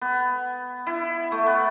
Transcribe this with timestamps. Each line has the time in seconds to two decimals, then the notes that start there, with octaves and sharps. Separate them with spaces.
0.02 B3
0.87 E4
1.32 A3
1.46 B3